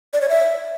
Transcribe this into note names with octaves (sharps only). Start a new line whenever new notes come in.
D5
C#5
E5